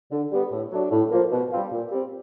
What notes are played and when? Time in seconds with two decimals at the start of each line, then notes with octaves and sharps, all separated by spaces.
0.12 D3
0.32 G3 B3
0.51 A2
0.72 F#3 A3 D4
0.91 A2
1.11 F3 A#3
1.31 B2
1.51 G3 C4 F4
1.72 A#2
1.91 G3 C4